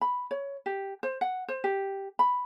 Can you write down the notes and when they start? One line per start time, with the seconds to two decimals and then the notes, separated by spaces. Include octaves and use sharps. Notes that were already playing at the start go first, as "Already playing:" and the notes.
0.01 B5
0.31 C#5
0.66 G4
1.03 C5
1.21 F#5
1.48 C5
1.64 G4
2.19 B5